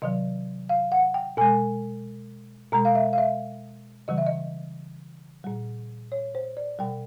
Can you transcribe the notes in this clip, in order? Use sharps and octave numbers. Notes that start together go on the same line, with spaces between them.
C3 D#3 F#3 D#5
F5
F#5
G5
B2 G#3 G#5
B2 G#3 A#5
F5
E5
F5
E5
C#3 E3 G3 D#5
E5
D#5
A#2 G3
C#5
C5
D5
B2 G3 G5